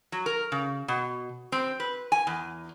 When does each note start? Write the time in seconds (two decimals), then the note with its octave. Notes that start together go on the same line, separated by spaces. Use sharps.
0.12 F#3
0.26 A#4
0.52 C#3
0.88 B2
1.52 C4
1.80 B4
2.12 G#5
2.27 E2